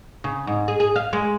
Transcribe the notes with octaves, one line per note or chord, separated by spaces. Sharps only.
C#3
G#2
G#4
G#4
F5
G#3